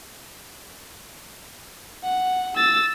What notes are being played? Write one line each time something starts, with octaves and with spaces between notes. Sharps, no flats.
F#5
E6 A6